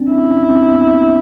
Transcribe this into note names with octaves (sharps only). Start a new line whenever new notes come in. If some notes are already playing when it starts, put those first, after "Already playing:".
Already playing: C4 D4
C#4 E4
C#4
C4
B3
A#3